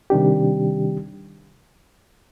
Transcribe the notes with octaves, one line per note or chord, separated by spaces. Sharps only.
C3 D#3 G3 D4 G4